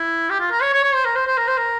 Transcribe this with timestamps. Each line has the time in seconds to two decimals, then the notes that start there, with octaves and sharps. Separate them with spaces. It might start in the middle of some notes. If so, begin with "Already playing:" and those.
Already playing: E4
0.30 G4
0.40 F4
0.51 A#4
0.62 C#5
0.73 C#5
0.83 C#5
0.94 C5
1.05 A#4
1.16 C5
1.27 C5
1.38 A#4
1.48 C5
1.57 A#4